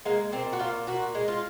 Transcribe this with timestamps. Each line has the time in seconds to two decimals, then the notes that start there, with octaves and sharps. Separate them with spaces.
0.05 G#3 A#3
0.32 A#2 C4
0.53 F#4
0.59 A#2 F4
0.87 A#2 F#4
1.15 G#3
1.28 F4